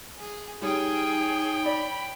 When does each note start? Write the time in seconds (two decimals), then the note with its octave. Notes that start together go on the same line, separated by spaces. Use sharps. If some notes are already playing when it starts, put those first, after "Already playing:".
0.18 G#4
0.62 G3 D#4 G#4 C#5 G5
1.66 D5 B5